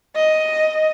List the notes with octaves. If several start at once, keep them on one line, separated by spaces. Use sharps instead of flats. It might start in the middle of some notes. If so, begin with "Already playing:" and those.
D#5